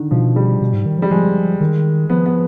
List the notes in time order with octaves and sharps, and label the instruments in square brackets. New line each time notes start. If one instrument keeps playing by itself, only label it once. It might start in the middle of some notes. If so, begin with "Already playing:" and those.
Already playing: [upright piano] D3 D#3
[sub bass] B2 [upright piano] F3
[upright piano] G3
[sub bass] B2
G#2
D#3
F3
[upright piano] G3
[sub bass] F3 [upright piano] G#3
[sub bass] D#3
[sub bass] F3 [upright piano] B3
[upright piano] B3